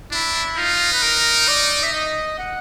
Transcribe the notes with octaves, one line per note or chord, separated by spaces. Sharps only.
D4 E4
D#4 F4
B4
A#4
D5
E5
D#5
F#5